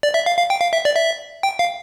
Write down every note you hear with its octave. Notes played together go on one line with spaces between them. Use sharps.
D5
E5
F5
F5
G5
F5
E5
D5
E5
G5
F5